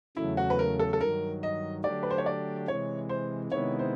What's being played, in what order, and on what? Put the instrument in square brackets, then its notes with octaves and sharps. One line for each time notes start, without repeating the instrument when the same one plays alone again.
[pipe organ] E2 C#3 F#3 A3 [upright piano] E4
[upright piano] F#4
B4
A#4
A4
A4
[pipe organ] G2 D#3 F#3 [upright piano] A#4
[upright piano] D#5
[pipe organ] D3 F#3 A3 D4 G4 [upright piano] D5
[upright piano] B4
C5
C#5
D5
[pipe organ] C3 E3 G#3 [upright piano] C#5
[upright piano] C5
[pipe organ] C3 D#3 G#3 B3 E4 [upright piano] C#5
[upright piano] C5